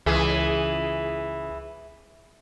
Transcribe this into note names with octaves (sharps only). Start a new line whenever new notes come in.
C#2 E3 G#4